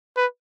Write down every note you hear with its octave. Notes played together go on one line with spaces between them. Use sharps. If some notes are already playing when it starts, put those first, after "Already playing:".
B4